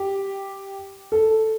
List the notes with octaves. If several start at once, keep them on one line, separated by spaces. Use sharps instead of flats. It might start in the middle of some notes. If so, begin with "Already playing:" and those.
Already playing: G4
A4